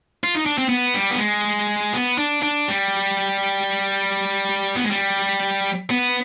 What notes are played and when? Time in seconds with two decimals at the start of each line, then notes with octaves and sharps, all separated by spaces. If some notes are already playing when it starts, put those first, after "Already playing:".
0.24 F4
0.35 D#4
0.46 D4
0.58 C4
0.69 B3
0.94 G3
1.11 B3
1.18 G#3
1.93 B3
2.18 D4
2.43 D4
2.68 G3
4.76 B3
4.84 G#3
4.91 G3
5.90 B3